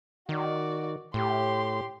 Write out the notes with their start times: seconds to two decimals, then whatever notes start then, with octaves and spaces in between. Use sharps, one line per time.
0.29 D#3 F#4 D5
1.14 A2 G4 C6